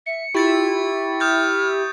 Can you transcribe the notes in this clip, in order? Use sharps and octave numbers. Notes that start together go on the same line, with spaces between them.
E5 C#7
E4 F4 G4 C#6 A6 C#7
D#6 F6 G6 A6